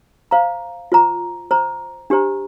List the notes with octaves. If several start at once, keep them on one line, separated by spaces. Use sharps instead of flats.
C5 F5 A#5
F4 C5 A#5
C5 A#5
D4 G4 C5 A#5